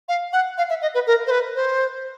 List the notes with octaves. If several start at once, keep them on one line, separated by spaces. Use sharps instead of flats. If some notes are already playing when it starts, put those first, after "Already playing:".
F5
F#5
F5
E5
D#5
B4
A#4
C5
B4
C5